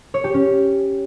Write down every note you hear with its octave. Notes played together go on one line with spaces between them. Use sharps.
C#5
G4
C#4